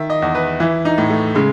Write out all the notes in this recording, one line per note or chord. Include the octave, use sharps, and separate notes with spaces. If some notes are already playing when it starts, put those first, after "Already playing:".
Already playing: D#3 E5
D#5
E2
B4
E3 E4
D#4
A2
A3
C#3 G#3